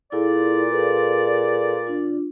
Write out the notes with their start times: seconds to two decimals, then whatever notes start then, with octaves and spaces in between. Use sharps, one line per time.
0.12 A#2 E4 G#4 A4 D5
0.71 G#4 A4 B4
1.87 D4 F4